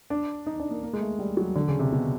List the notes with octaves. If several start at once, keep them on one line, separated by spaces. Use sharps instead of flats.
D4
D#4
D4
A#3
A#3
G#3
A3
G3
F#3
D3
C#3
C3
B2